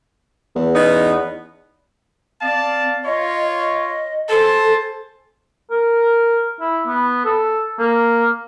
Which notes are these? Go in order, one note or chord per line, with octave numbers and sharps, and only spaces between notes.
E2
B3 C#4 D#4
C4 D5 F5 A5
F4 C#5 D#5
D#5
A4 C5 G#5 A5
A#4
E4
B3
A4
A#3